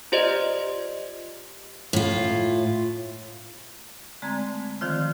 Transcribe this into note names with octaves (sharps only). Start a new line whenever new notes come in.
F4 G4 C5 D5 D#5
A2 F4
D3 G#3 A3 C4 A#5 G#6
D3 D#3 F3 C4 F4 C5